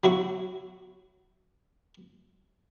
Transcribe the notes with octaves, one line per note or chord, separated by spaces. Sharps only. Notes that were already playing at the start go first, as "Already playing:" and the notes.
F#3 E4 F#4 C#6